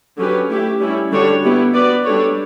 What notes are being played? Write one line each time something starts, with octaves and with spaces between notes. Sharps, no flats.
D3 F#3 C#4 G4 B4
A3 E4 G4
G3 C#4 E4
D3 G3 D4 F#4 C#5
B3 E4 G4
B3 F#4 B4 D5
G3 D4 A4 C#5